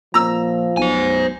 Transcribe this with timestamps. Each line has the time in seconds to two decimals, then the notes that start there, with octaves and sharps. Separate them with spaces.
0.14 A#2 F3 A#5 E6
0.77 B1 C5 G#5